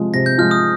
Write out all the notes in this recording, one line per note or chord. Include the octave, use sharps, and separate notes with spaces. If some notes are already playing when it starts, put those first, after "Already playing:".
Already playing: C3 F3 G#3
C3 A#6
G6
F3 G#3 F6
D#6